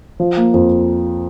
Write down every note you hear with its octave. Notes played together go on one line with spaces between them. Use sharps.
F3
A#3
F2